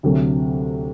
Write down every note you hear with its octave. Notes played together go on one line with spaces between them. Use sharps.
D2 C3 F#3 A3